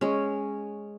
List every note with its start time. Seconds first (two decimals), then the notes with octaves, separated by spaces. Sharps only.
0.01 G#3 C#4